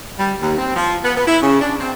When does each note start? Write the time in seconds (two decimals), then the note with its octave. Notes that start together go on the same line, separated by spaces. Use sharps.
0.19 G3
0.41 D#2
0.58 C4
0.76 F3
1.04 B3
1.16 B3
1.27 E4
1.42 C#3
1.61 D4
1.80 C4